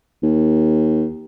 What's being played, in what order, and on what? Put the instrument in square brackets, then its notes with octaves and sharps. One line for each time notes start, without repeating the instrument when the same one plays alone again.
[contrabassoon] D#2